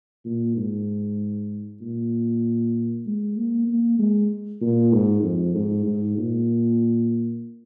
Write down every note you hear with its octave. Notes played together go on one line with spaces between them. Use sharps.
A#2
G#2
A#2
G#3
A#3
A#3
G#3
A#2
G#2
F2
G#2
G#2
A#2